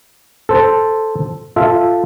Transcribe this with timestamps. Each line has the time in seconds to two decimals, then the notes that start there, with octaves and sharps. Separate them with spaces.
0.49 A4 C5
1.56 F4 A4 E5